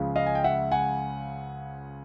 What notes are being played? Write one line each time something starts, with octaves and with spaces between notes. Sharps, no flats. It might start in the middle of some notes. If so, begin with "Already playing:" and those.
Already playing: C#2 C#3 F3 G#3
D#5 F5
G#5
G5
E5 F#5
F#5 G#5